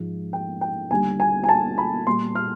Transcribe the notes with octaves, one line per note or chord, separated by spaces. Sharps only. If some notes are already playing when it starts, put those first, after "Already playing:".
Already playing: G#2 F3 G#3
G5
G5
D#2 D3 G3 G#5
G#5
G#5
A5
B5
A#2 G3 C6
F6